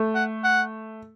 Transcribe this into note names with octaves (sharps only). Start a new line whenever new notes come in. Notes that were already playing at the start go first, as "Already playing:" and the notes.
Already playing: A3
F#5
F#5